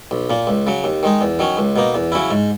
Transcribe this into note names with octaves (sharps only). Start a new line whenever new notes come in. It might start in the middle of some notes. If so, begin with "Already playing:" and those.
B1
A#2 A#3
C#2
C#3 F#3
D#2
D#3 G#3 D#4
E2
D#3 F#3 C#4
C#2
B2 A#3 D#4
E2
C#3 F#3 C#4 E4
G#2